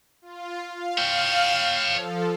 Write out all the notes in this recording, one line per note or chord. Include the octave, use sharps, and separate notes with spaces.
F4
F5
C#5 G5
F3 A4